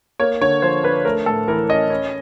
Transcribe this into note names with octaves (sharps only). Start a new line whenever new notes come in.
A#3 C#5
D3 C#5
F3 C5
D4 B4
A3 A#4
A2 A4
E3 A#4
C#4 D#5
C#4